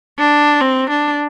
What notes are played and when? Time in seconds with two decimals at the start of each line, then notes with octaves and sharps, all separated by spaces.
0.19 D4
0.61 C4
0.90 D4